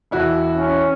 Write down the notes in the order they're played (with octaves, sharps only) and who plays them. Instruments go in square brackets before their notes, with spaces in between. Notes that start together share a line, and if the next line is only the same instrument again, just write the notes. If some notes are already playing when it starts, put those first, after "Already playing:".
[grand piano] E1 E4 F#4
[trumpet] C#4